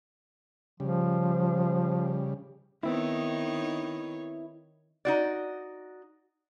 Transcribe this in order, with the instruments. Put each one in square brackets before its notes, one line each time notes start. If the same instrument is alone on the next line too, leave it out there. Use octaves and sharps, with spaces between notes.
[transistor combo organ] C#3 G3 [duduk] F3
[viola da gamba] D#3 D#4 C#5 [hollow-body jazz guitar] B3 C4 E4
[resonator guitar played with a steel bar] D#4 F#4 D5